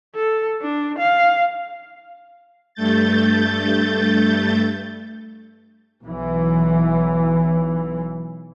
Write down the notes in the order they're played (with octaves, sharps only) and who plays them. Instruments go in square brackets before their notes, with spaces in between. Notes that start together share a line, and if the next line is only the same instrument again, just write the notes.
[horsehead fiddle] A4
D4
F5
[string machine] G2 A3 G6 A6
[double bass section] B1 E3